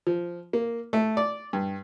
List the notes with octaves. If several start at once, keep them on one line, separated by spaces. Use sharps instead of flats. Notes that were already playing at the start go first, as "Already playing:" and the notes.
F3
A#3
A3
D5
G2